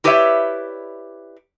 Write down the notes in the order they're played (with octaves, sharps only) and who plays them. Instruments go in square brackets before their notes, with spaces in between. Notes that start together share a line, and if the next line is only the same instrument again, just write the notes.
[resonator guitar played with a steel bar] E4 G4 B4 C#5 D5 E5